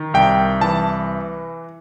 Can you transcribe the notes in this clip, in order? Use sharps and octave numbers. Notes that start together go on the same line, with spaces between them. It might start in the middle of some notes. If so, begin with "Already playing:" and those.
Already playing: D#3
C2 G5
E3 A5